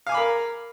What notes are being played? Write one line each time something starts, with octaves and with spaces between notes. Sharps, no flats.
A#4 F5 G#5 B5 D6